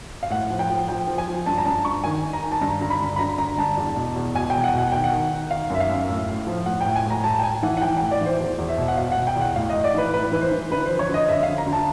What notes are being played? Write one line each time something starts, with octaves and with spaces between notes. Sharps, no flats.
F5
A2 F#5
F3
G5
F3
F3 G5
F3
G#5
F3
G2 A5
A#5
G2 A5
G2 C#6
D#3 G#5
D#3
A#5
D#3
A5
G2 A#5
D3 A#5
B5
G2
B5
D3 A#5
D3 A#5
G2 A5
E2
B2
E2
B2 G#5
E2 G5
F#5
B2 F#5
D#3 G5
F#5
D#3
D#3
D#3 F5
F#2 E5
F5
F#2
A2
A2
F3
A2 F#5
A2 G5
G#5
A2 A#5
A2 A5
G5
A2 G#5
E3 F#5
F#5
E3 G5
A2 G5
D5
E3 C5
E2 C5
E2
E5
B2
F#5
B2 F5
B2 F#5
G5
E2
F#5
A2 F5
D#5
A2
D5
E3 B4
A2 B4
E3 B4
C5
E3
D3 B4
F3 C5
C#5
D3 D#5
F2 E5
F5
D3
A#5
D3
A5